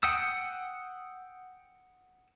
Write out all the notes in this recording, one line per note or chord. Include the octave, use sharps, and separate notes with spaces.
F#5 G5 D#6 E6